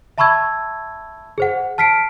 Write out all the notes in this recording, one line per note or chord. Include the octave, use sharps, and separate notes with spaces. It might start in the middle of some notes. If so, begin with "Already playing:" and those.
E5 A5 B5 C#6 E6 G#6
G#4 C5 F#5
A5 F6 B6 C7 D7